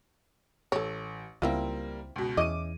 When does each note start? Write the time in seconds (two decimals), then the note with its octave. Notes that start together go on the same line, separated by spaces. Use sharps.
0.72 A1 A4 C#5
1.42 C#2 G3 A#3 C4 E4 F4
2.16 C#2 B2
2.37 E2 E3 C#4 D#5 D6 D#7